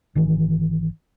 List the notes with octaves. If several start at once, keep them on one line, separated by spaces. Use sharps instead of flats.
G#1 D#3 E3